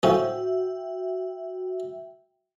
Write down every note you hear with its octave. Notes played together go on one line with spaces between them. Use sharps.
A2 F3 C#4 F#4 E5 G5